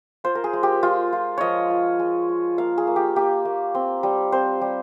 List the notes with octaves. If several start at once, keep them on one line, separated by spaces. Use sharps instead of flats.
F4 C5
A#4
G#4
G#3
G4
G#3 F4
F4
F3 C#5 D#5
F4
G#3
F4
A#3 F5
G#4
A#3
G4
A#3 G4
A#3
C4
G3
C4 C5
G3